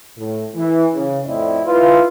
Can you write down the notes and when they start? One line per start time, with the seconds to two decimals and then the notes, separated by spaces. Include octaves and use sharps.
0.18 A2
0.55 E3
0.94 C#3
1.26 F2 A2 C4 E4 D5 D#5
1.65 E4 F4 B4